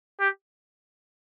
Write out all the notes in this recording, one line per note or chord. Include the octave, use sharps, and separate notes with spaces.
G4